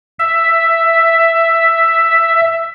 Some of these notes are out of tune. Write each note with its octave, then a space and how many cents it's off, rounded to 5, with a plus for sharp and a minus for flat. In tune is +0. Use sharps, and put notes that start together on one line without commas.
E5 +5